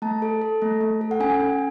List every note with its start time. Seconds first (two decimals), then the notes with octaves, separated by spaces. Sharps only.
0.02 A3 A5
0.22 A4
0.42 A4
0.62 A3
0.81 A3
1.01 A4
1.11 F#5
1.20 C#4 G#5
1.40 C#4